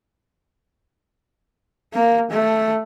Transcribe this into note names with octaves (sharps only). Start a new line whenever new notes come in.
A#3
A3